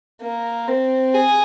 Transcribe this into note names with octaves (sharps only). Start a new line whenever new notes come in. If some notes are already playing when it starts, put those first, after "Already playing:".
A#3
C4
G#4